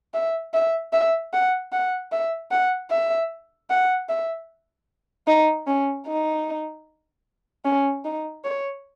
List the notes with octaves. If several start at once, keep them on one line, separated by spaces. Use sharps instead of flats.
E5
E5
E5
F#5
F#5
E5
F#5
E5
F#5
E5
D#4
C#4
D#4
C#4
D#4
C#5